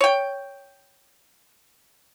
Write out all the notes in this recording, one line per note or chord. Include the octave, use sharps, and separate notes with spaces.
C#5 G5